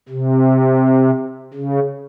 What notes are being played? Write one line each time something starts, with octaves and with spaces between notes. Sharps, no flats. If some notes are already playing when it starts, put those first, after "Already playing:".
C3
C#3